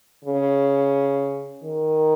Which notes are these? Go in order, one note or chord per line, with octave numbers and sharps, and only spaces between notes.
C#3
D#3